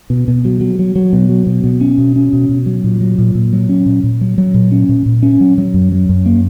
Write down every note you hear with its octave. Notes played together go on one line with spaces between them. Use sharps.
B2
B2
F#3
F#3
F#3
F#3
B2
F#3
B2
B2
C#4
B2
C#4
B2
B2
F#3
A#2
F#3
A#2
A#2
F#3
C#4
A#2
A#2
F#3
F#3
A#2
C#4
A#2
A#2
C#4
F#3
F#3
F#2
F#3
F#2
A#3